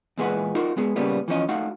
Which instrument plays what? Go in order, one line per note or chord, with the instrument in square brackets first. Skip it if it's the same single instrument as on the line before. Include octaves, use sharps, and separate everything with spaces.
[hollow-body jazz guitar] E2 A#2 G#3 G#4 B4 F#5
D#4 F4 F#4 A#4
G#3 B3 G#4
A#2 C#3 G3 A#3 B3
E3 F3 C#4 D#5
A3 D#4 F#4 F5 F#5